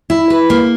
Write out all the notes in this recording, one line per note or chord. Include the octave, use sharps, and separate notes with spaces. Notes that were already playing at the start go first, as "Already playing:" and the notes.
E4
B4
A#3